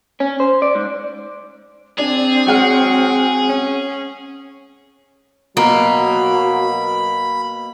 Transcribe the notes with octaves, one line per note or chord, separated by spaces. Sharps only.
C#4
C5
D5
G#2
C4 D4 G#4
F#3 G#3 F#5 F6
C#4
B2 F#3 A#3 B5